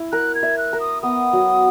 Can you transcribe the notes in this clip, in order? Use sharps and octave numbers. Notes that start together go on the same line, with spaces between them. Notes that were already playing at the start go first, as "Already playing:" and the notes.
Already playing: E4
A#4 F#6
G#6
E5
F#6
A#4
D#6
B3 D#6
F#3